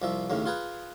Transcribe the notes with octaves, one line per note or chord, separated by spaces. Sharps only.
C2 F3 E5
D#2 A2 C#3
F4 G#4 B4